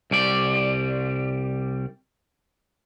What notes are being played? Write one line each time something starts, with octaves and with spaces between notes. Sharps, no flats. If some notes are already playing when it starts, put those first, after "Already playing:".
C2 G3 D5